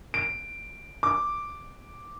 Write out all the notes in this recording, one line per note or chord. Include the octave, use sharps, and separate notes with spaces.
D7
D6